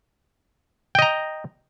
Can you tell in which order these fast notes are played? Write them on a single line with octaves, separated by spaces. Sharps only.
G5 D#5 A#5